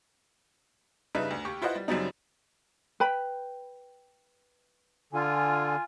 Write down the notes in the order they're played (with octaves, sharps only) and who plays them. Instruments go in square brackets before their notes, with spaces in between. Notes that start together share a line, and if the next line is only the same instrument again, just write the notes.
[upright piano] G2 C#3 D#4 B4 E5
D2
D#2 G4 C#6
E4 F4 B4 C5 D#5 F#5
G3
F#2 C#3 F#3 G3 C4 D#4
[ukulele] B4 G5 B5
[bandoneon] D3 [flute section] F4 G#5